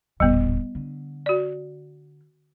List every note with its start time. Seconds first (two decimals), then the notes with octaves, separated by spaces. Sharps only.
0.20 D#1 A1 G3 B3
0.75 D3
1.26 F#4 D5